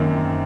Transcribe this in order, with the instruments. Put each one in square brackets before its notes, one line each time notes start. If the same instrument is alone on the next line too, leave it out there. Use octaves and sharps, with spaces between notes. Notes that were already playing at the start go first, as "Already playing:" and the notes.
Already playing: [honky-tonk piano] F#2 D#3 [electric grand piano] A#3 C4